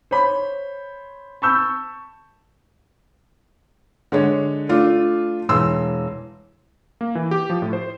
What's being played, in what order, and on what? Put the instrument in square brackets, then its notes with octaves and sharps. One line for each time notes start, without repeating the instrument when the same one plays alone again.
[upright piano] C5 C#5 B5
A5 B5 C#6 E6 G6
[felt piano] D3 G#3 C#5
A3 D4 F4
E1 E3 C6 E6
[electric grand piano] A#3
E3
G4
F3
A2
C5